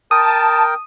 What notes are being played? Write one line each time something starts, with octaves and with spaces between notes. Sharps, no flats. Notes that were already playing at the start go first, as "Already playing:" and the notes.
A#4 G5 A5 D#6